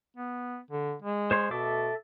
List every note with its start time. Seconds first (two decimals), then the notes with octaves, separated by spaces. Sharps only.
0.17 B3
0.71 D3
1.02 G#3
1.31 C5 C#5 C6
1.51 B2 A4 E5 D6